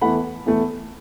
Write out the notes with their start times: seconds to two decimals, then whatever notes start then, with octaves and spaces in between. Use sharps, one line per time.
0.01 E2 E3 A3 F#5 B5
0.46 E2 E3 A3